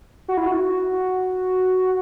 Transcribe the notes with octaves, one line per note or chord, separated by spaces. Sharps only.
F#4
E4
F#4